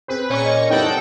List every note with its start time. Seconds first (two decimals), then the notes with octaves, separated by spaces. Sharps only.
0.08 C4 G#4 B4 C5
0.30 A#2 C#4 C#6
0.44 D#5
0.70 F#1 E3 G3 D#4 A4 F#5 G5
0.83 C3